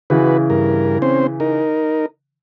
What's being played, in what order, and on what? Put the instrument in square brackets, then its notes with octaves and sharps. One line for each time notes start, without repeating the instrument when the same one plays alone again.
[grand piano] C#3 E3 [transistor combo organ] F#4 B4
[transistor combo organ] G2 A#4
C4 C#4 C5
D#4 A#4